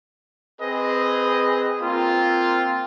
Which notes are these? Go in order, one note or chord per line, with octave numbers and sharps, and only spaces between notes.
C4 G#4 B4 D#5
A#3 C4 F4